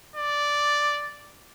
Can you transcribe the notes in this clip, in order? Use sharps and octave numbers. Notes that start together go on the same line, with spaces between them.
D5